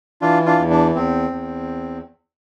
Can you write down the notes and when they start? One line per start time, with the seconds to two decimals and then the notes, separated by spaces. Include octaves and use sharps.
0.22 E3 D4 F4
0.46 D4 F4
0.59 E2
0.70 D4
0.95 E2 C4
1.31 E2